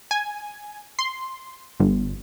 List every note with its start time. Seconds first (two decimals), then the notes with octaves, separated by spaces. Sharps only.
0.11 G#5
0.99 C6
1.80 G1